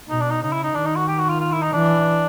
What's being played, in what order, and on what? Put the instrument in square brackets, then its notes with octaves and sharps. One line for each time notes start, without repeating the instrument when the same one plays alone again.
[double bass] B2 [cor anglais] D#4
[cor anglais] D4
D#4
[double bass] C#3 [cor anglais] D#4
[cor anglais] E4
D#4
[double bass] D#3 [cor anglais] D4
[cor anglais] D#4
F#4
G4
F#4
F4
F4
E4
D#4
[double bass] E3 [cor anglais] D4